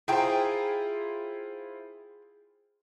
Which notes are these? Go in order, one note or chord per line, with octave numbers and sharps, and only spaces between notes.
E4 F4 G#4 C5 G5 A#5